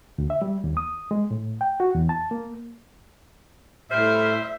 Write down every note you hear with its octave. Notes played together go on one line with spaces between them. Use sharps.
D2
E5
G3
D#2
D#6
G#3
A2
G5
F#4
E2
A5
A#3
A2 G3 C5 E5 F6